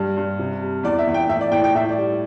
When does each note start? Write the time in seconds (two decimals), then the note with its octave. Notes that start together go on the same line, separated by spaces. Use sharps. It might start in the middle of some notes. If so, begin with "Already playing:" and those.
Already playing: G2 G3
0.17 G2
0.39 C3
0.62 G3
0.83 E2 D5
0.99 E5
1.07 E2
1.14 G5
1.29 A2 E5
1.41 D5
1.51 A2 G5
1.64 G5
1.75 A2 E5
1.90 D5
1.98 G3